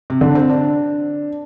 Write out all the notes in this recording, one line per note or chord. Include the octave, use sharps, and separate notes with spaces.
C3
D3
D4
C4
D4